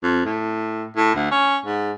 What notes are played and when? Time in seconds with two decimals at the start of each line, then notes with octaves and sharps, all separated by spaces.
0.03 F2
0.26 A2
0.97 A2
1.15 D2
1.31 C#4
1.66 G#2